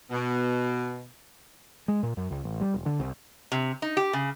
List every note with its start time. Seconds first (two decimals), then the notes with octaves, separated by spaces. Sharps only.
0.11 B2
1.88 G#3
2.03 A#2
2.17 F#2
2.31 C#2
2.44 A1
2.61 G3
2.74 E1
2.86 D3
3.00 C2
3.52 C3
3.82 D#4
3.97 G4
4.13 C#3